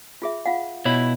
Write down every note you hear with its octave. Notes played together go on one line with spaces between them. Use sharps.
F4 G#4 E5
F4 F5 F#5
B2 E4 C#5 B5